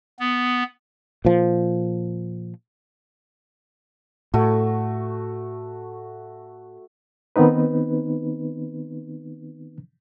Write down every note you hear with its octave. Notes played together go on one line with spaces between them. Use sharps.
B3
A#2 F3
A2 A3 F#4
D#3 B3 C4 D#4 B4